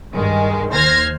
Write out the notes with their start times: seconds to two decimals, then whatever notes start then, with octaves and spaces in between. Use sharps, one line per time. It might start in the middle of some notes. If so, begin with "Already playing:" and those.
0.14 G2 D#3 G#3
0.72 D#2 C5 F6 G#6 A#6